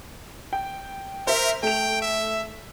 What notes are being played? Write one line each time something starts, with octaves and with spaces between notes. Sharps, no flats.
G5
A#4 C5 E5
A3 G5 F7
E5